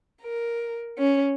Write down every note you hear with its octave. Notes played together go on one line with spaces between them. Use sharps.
A#4
C#4